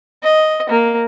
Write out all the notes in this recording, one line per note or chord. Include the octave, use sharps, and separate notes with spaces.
D#5
A#3